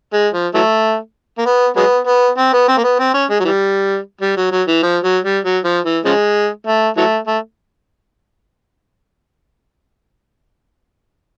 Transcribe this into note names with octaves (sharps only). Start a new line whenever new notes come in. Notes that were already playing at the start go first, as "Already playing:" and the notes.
G#3
F3
E3 F#3 A3
A#3
B3
F#3 G#3 B3
B3
C4
B3
C4
A#3
B3
C4
C#4
G#3
F#3
E3 G3
G3
F#3
F#3
E3
F3
F#3
G3
F#3
F3
E3
C#3 F3 G#3
A3
E3 F#3 A3
A3